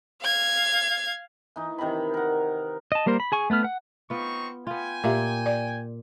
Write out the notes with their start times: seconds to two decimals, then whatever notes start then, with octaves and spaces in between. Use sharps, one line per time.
0.22 F5 G#6
1.56 E3 D#4
1.78 C3 D#3 A#5 B5
2.14 A#4 F#5
2.92 D#5 A5
3.06 G3 A#3 A#4 C5
3.20 B5
3.32 G#4 G#5 C#6
3.50 A3 B3 B4 F6
3.64 F#5
4.10 B3 C4 D#4 F4 C#6
4.67 B3 F4 G5 G#5
5.04 A#2 G4 E5 F5
5.46 D5